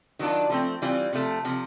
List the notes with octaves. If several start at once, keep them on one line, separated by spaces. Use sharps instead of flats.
D#3 F#3 D4 F4
F3 A3 C4
E3 G3 C4 F4
C3 F3 A3
C3 F3